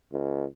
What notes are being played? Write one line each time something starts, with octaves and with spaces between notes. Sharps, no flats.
C#2